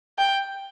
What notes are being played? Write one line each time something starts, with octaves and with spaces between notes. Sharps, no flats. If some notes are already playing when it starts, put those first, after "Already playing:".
G5